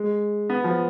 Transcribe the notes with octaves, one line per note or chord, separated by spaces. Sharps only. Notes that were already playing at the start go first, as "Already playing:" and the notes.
Already playing: G#3
B3
F3